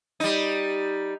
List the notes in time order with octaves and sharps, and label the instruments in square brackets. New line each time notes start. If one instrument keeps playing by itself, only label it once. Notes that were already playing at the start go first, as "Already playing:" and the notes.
[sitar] G3 D#4